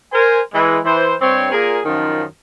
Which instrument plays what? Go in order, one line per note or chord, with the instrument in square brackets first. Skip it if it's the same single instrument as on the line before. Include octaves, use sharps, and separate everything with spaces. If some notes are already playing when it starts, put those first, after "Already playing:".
[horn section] A#4 C5 G#5
E3 G#3
E3 C5
G2 C4 C#5
A#2 G#4 A#4
F#2 D#3 F3